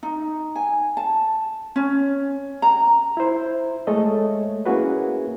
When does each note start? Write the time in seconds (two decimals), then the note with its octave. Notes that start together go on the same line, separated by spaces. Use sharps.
0.03 D#4
0.56 G#5
0.97 A5
1.76 C#4
2.62 A#5
3.17 E4 C5
3.87 G#3 A3 A4 C#5 D#5
4.66 A#3 C#4 E4 F#4 G#4 B4